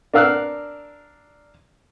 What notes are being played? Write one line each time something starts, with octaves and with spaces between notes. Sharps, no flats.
D4 A#4 F5 E6 F#6